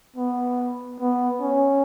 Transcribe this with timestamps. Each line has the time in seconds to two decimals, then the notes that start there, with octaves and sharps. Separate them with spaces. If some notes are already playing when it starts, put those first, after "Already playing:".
0.16 B3
1.00 B3
1.41 C#4